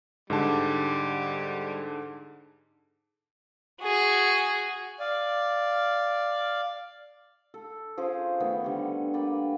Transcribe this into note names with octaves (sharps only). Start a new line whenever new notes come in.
G#2 D3 G3 A5
F#4 G#4
D5 F5
A4
F3 C#4 G#4 C5
D#3 A3 B3
D3 G3
A#3 B4 D5 G5